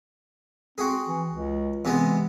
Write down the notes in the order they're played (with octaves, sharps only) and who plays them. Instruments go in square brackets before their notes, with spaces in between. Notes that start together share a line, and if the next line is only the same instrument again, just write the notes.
[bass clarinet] C4 [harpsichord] F#4 G#4
[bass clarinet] E3
C#2
[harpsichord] C3 G#3 B3 [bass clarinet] E3